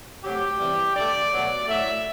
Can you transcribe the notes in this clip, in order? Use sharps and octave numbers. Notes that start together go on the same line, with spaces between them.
C3 F#3 A3 G4
C3 E3 G3
D3 A3 D5
B2 F#3 A3
A2 F#3 A3 E5